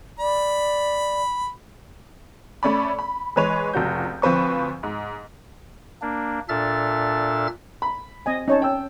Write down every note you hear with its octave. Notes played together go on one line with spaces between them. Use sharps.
D5 B5
A3 C#4 D5 B5
B5
E3 G#3 B4 C#5 F7
F1 C#2 F#4 G6
D2 F3 C4 B4 C#6
G#2
A#3 D4
A#2 D4 A4 E5 F6 A6
B5
C4 D#5 G#5
C#4 D#4 C#5 A5
G5 E6